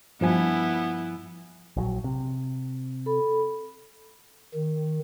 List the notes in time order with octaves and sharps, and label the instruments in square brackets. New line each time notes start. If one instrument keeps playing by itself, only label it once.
[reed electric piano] G2 F3 G#5 [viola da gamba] B3 E4
[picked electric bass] A#1 F3 F#3
C3
[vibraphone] A4 B5
[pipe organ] D#3